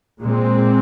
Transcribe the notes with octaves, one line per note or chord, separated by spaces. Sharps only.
A#2 G#3 C4